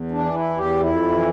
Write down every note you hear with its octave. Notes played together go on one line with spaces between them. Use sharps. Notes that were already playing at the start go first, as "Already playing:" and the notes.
Already playing: E2
D4
E3
E4
E2
G4
F2 E4
E3